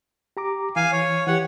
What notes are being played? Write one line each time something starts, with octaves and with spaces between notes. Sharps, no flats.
G4 A#5 D6
E3 F5 G#5
C#5
E3 G4 C#5 F#5